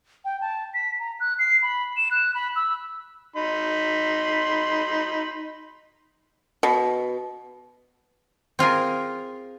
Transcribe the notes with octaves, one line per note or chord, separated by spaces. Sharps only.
G5
A5
B6
A#5
F#6
C7
B5
E7
F#6
B5
E6
D#4 B5 C6
B2
C4 F4 G#4 A#4